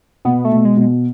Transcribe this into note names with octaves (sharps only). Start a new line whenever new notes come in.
B2 B3
A3
B2
G#3
B2